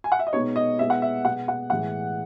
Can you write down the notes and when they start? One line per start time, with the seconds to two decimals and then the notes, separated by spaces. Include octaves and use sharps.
0.04 G#5
0.12 F#5
0.19 E5
0.27 D#5
0.33 B2 G#3 B3 D#4 C#5
0.56 D#5
0.79 B2 G#3 B3 E4 E5
0.90 F#5
1.02 E5
1.24 B2 G#3 B3 F#5
1.48 F#5
1.70 A2 E3 G#3 F#5